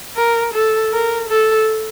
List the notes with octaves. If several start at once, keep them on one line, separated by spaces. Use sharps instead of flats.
A#4
A4
A#4
A4